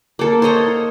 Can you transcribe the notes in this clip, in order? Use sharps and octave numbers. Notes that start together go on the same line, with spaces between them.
A#3 A4
C5 C#5 D#5 A#5